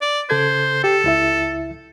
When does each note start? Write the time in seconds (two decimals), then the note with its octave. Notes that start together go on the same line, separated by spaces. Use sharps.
0.02 D5
0.30 C#3 A4 C5 G#6
0.84 G4 A4
1.04 C#2 E4 E5